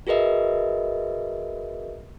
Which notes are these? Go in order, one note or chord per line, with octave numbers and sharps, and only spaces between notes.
F#4 G#4 A#4 B4 D#5 E5